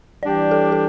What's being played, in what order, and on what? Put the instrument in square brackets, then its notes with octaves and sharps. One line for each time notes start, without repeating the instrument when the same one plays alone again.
[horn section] E3 G3 D4 G4 [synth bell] D5
[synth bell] A4
A4